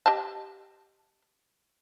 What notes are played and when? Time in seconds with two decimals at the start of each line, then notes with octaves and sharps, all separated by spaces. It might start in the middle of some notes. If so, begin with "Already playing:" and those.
0.06 G4 D#5 A5